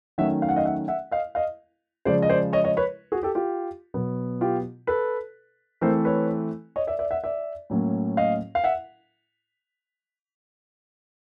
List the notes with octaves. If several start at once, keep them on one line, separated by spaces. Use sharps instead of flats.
D#3 F#3 A3 C#4 E5 F#5
F5
F#5
D#5 F5
E5 F#5
E5 F#5
D#5 F5
D#5 F5
C#3 F3 G#3 C5 D5
D#5
C5 D5
C#5 D#5
C#5 D#5
B4 C#5
F#4 G#4
G4 A4
F4 G4
B2 F#3 B3
F4 G4
A4 B4
E3 A3 C4 A#4 C5
B4 C#5
C#5 D#5
D5 E5
D5 E5
E5 F#5
D5 E5
A2 F#3 A#3 C#4
D#5 F5
F5
E5 F#5